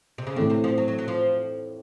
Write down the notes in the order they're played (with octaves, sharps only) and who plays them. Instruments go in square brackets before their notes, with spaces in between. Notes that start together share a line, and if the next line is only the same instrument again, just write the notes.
[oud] C3
C#3
[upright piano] A2 E3 A3 C4 [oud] D3
[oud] C3
F3
F#3
F#3
F#3
F3